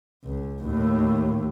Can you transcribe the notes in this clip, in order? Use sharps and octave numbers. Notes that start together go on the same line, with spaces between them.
C#2
D#2 A2